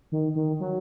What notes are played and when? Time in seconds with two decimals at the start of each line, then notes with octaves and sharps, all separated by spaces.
0.12 D#3
0.35 D#3
0.60 F#3